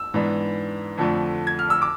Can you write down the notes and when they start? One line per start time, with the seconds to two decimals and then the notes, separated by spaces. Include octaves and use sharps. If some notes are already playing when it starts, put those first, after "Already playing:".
Already playing: E6
0.14 G#2 E3 B3 D4
0.98 F2 D3 F3 A3 D4
1.47 G#6
1.59 F6
1.70 E6
1.82 D6